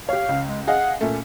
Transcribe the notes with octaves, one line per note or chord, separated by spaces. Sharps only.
G4 C#5 F5
C#2
G#3
G#4 D#5 F5 F#5
A#2 A3 C#4